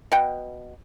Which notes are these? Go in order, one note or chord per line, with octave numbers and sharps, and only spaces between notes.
B2 F#5 G5